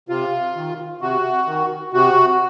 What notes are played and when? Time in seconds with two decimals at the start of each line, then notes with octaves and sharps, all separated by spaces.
0.09 C3 F4
0.55 D#3
1.01 C3 F#4
1.47 D#3
1.93 C3 F#4